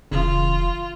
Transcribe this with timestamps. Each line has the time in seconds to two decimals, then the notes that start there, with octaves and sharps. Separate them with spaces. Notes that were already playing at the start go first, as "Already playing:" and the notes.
0.11 E1 C#3 E3 F4